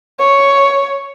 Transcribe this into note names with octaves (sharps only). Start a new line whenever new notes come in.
C#5